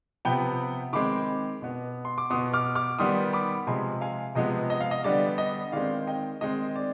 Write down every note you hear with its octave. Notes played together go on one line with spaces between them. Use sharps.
C3 F3 B3 G5 B5
D#3 G#3 C4 B5 D6
B2 B3
C6
D6
B2 B3 C6 D#6
D6 F6
D6 F6
D#3 G3 B3 C6 D#6
B5 D6
C3 F3 G#3 G#5 C6
F5 G#5
C3 F3 G#3 B3 D#5
D#5
F5
D#5
D3 G3 B3 D5
D#5
D#3 G#3 C4 D5 F5
D#5 G5
D#3 G#3 C4 D#5
D5